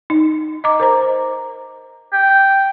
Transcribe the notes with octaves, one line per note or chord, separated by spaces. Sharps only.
D#4
D#5 A#5 D6
A#4 C5 A#5
G5